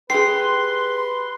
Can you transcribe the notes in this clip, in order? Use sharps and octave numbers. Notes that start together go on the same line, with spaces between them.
G4 G#4 B4 C6 C7